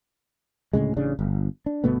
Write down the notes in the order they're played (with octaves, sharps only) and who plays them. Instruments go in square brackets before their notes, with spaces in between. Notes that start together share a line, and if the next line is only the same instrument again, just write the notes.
[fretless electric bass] D2 A2 C#3 G#3
A1 C#3 D4
G1
D4
G1 B2 A3 B3